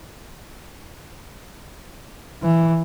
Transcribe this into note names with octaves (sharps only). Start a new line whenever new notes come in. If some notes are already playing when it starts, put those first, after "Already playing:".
E3